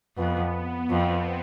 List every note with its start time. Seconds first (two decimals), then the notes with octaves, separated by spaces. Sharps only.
0.17 F2 B3
0.53 B3
0.90 F2 C4